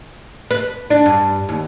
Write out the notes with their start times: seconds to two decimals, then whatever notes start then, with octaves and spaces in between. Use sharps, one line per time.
0.51 B4
0.90 D4
1.06 G2
1.49 D#2